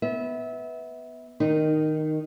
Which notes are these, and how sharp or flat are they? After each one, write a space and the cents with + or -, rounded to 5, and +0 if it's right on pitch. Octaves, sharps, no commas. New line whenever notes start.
B3 +0 E5 -25
D#3 +0 D#4 -15